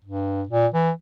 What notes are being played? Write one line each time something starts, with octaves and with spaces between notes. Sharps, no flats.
G2
A#2
E3